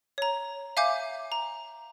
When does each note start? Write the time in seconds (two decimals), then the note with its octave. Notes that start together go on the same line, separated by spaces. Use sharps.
0.18 C#5 A#5
0.77 E5 F5 G#5 D6 G6
1.32 A#5